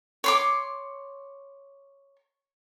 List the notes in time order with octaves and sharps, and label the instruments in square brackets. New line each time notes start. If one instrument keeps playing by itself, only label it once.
[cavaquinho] C#5 C6 D6